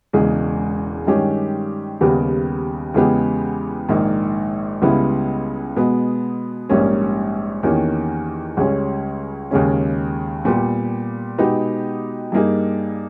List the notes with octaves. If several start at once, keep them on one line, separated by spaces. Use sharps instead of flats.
E1 E2 C#3 G#3
G2 D#3 G#3 C#4 G4
D#2 C#3 G3 B3 G4
E2 C#3 G#3 B3 G4
A#1 G#2 D#3 A#3
C#2 C#3 G3 B3 E4
B2 G#3 B3
A#1 G#2 G3 A#3 C#4
E2 D#3 A#3 C#4 G4
C#2 C#3 G3 C#4
D#2 C#3 G#3 C#4
A#2 G3 B3 G4
B2 G#3 B3 D#4 G4
G2 G3 A#3 D#4 G#4